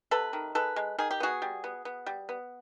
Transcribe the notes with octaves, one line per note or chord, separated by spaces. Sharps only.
C3 A4 B4
D#3
G#3 A4 B4
G#3
D#3 G#4
G4
B3 F#4 G#4
G3
B3
B3
G3
B3